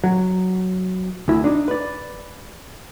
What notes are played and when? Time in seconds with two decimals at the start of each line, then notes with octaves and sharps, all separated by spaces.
0.04 F#3
1.28 D2 E4
1.44 D4 D#4
1.68 B4 D5